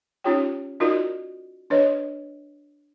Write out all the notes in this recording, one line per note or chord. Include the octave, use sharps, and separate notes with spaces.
C#4 D#4 F4 G4 C#5 G5
D#4 F4 F#4 A#4 D5 D#5
D4 B4 C#5 D#5